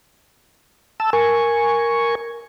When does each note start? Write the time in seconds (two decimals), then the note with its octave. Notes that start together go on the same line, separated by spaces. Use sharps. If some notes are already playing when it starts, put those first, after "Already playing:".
1.00 A5 E6
1.13 A#4 G#5 C#6